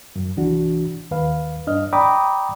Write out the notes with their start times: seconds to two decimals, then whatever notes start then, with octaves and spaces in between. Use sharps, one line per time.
0.16 F#2
0.37 C2 E3 D4 F#4
1.11 D#2 B4 F5
1.67 G2 D4 D#5 F6
1.93 D5 G5 A#5 B5 D6 D#6